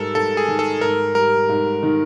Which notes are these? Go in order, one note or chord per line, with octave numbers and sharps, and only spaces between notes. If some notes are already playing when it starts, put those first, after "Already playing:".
Already playing: G#2 G3 A4 A#4
G#2 A4
G#4
D#3
A4
G#2 A#4
G3 A#4
G#2
D#3